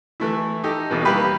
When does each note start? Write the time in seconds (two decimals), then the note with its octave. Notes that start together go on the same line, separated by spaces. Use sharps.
0.20 E3 A3 E4
0.64 D#4 G4 A4
0.90 A1 D#2 B2 E3
1.05 E3 G3 A#3 G4 B4 B5